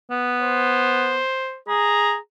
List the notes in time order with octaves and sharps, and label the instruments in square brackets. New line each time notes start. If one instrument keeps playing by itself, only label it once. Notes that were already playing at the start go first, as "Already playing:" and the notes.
[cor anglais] B3
[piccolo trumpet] C5
[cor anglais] G#4 [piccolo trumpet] A#5